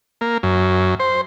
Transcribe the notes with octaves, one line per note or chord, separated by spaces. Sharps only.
A#3
F#2
C5